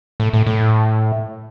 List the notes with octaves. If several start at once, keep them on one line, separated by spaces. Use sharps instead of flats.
A2
A2
A2